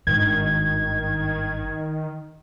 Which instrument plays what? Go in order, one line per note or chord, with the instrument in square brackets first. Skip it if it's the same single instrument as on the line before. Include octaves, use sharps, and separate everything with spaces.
[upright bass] G#1 G2 [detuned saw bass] D#3 [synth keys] G#6